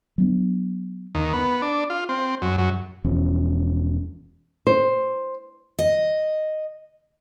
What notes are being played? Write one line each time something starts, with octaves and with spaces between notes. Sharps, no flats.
F#3 B3 D4
D#2
B3
D4
F4
C4
F#2
F#2
E1 E2 F3 C#4
C5
D#5